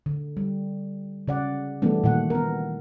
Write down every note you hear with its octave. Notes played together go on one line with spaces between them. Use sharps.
D3
G3
C#3 D5 F#5
E3 G3 A3 B3 D4
A#2 D#3 F#5
B3 A#4